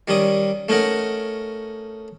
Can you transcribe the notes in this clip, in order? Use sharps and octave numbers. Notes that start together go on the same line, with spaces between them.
D#3 G3 C#4 D#6
A3 C#4 D#4 A#4 F#5